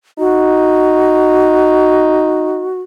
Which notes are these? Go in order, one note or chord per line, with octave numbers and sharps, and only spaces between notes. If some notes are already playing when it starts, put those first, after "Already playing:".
D#4 F#4